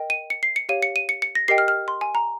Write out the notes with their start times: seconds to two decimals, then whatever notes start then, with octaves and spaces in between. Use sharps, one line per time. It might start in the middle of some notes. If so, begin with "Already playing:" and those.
Already playing: A#4 D#5 G5
0.10 D#7
0.30 C#7
0.43 C7
0.56 C#7
0.69 G4 C#5 F5 D#7
0.83 C#7
0.96 D#7
1.09 C#7
1.22 C#7
1.35 A#6
1.48 G4 A#4 D#5 G5 C7
1.58 F6
1.68 F6
1.88 C6
2.01 G#5
2.15 A#5